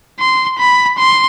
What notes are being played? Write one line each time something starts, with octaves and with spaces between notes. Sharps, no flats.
C6
B5
C6